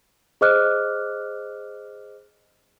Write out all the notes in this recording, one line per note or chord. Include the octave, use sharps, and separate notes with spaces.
G#4 C5 D#5 D6 F6 F#6